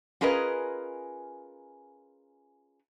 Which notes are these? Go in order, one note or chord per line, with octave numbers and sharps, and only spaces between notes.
C#4 F4 G#4 A#4 B4 D#5